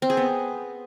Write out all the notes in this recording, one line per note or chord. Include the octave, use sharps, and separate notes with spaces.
C4
G#4
B3